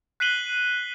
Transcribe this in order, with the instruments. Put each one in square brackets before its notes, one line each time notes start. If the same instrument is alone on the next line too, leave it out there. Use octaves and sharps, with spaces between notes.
[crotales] F#6 B6 C7 D#7 F#7 G7